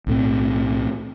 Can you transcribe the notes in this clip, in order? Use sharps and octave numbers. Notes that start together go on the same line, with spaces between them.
B1 A2 C4